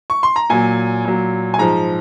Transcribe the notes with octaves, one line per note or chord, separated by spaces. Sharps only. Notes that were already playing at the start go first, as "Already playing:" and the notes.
C#6
C6
A#5
A#2 F#3 G#5
A#2 F#3
G#5
G#2 F3 A#5